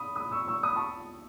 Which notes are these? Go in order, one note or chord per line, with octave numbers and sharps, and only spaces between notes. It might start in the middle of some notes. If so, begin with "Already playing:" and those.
Already playing: B5 D#6
B5 D#6
C#6 E6
C#6 E6
B5 D#6
A5 C#6